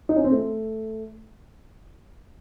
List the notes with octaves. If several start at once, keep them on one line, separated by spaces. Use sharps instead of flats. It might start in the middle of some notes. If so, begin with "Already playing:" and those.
D#4
C#4
C4
A3